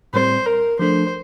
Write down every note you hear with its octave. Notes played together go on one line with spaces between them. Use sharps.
A2 G3 C4 C5
A#4
F3 A3 D4 A4 C5